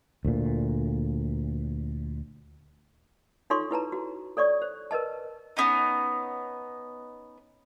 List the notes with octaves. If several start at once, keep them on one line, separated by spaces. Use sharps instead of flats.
D2 A#2
D#4 F4 A4 C#5 C6 C#6
E4 B4 A5 A#5
F#4
A4 C#5 D5 C#6
C5
A#4 B4 D#5 A5
B3 C#4 D#4